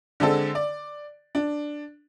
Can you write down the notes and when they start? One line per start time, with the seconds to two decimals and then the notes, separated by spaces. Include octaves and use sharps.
0.20 D3 G#3 C4 A4
0.55 D5
1.35 D4